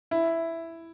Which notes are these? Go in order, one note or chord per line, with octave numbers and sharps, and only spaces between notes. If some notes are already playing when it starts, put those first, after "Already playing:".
E4